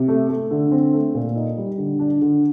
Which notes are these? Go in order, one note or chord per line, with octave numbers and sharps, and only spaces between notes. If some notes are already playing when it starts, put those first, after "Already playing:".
Already playing: C3
A3
A3
D3
C4
A3
A#2
D#4
G3
D3
D4
D3